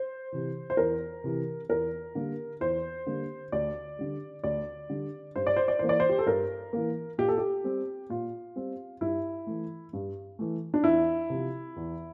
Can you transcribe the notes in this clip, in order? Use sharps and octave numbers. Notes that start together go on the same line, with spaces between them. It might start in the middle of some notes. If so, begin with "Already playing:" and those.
Already playing: C5
C3 E3
C5
E2 A#4
C3 E3
E2 A#4
D3 G3 A#3
E2 C5
D3 G3 A#3
D2 D5
D3 G3
D2 D5
D3 G3
G2 C5
D5
C5
D5
E3 A#3 C5
D5
C5
G4
A4
G2 A#4
E3 A#3
A#2 G4
A4
G4
G3 C4
A#2 F4
G3 C4
G2 E4
E3 A3
G2
E3 A3
D4
E2 E4
C3 F3
E2